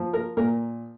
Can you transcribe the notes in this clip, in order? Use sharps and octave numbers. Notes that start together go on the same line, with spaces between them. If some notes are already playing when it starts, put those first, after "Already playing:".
Already playing: F3
A#4
A#2 A#4